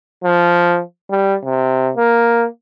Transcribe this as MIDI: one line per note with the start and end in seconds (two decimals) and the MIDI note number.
0.24 0.80 53
1.11 1.35 55
1.45 1.91 48
1.97 2.46 58